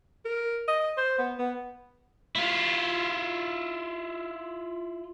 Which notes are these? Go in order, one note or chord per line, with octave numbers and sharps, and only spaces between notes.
A#4
D#5
C5
B3
B3
E4 F4